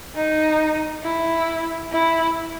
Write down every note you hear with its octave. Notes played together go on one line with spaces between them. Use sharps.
D#4
E4
E4